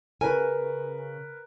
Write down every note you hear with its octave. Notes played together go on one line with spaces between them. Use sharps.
C#3 A#4 B4 G#5